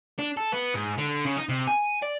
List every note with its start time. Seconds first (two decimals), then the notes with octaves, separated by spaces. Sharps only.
0.19 D4
0.37 A4
0.53 B3
0.75 G#2
0.99 D3
1.25 C#3
1.37 D#4
1.49 C3
1.67 G#5
2.02 D5